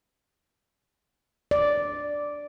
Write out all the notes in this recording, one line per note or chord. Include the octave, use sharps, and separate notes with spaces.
D5